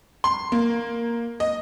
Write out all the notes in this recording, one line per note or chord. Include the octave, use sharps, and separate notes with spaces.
C6
A#3
D#5